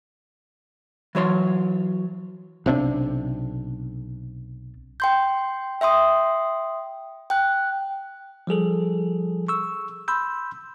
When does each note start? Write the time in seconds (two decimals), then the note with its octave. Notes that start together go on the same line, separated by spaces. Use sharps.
1.15 E3 F#3 C#5 C6
2.66 B1 C3 D#3 D4
5.00 G5 C6 G6
5.81 E5 G5 C6 D#6
7.30 G5 F#6
8.47 F3 G3 G#4 A4
9.48 C#6 E6
10.08 B5 C6 E6 G6